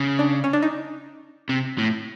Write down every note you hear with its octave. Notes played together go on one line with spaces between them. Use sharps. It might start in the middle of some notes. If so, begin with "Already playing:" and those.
Already playing: C#3
D4
C#4
D4
D#4
C3
A2